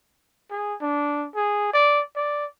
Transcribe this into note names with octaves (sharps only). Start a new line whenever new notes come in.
G#4
D4
G#4
D5
D5